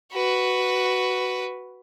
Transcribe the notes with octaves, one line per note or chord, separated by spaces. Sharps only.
F#4 B4